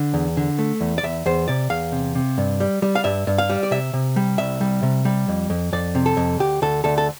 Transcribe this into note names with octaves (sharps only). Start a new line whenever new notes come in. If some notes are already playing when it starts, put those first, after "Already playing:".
Already playing: D3
E2
D3
A3
E2
D5
E2 E5
E2 C5
C3 D5
E2 F5
C3
C3
G2
G3
G3
F5
G2 E5
G2
F5
G3
D5
C3 E5
C3
G3
C2 E5
G3
C3
G3
F2
F2
F2 D5
C3
A4
F2
D2 G4
D2 A4
D2 A4
A4